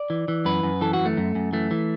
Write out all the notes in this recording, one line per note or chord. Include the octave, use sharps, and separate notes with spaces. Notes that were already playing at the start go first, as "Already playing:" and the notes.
Already playing: D5
E3
E3
F#2 B4
F#2
E3 A4
F#4
F#2
A3
F#2
F#2
E3 A3
E3